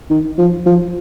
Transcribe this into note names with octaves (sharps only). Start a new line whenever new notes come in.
D#3
F3
F3